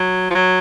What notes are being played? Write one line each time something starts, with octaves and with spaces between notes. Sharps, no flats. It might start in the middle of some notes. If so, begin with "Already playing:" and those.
Already playing: F#3
F3
F#3